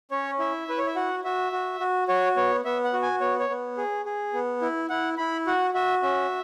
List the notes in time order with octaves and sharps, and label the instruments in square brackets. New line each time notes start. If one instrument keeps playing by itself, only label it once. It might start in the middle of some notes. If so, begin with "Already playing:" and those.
[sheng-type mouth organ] C#4 C#5
E4 E5
E4 B4
C#5
E5
F#4 F#5
F#4 E5
F#4
F#4
F#4 C#5
B3 C#5
B3 E5
F#5
F#4
G#5
B3 C#5
C#5
B3
G#4
G#4
B3
E4
E4 F#5
E4 B5
F#4 F#5
F#4 E5
C#4 E5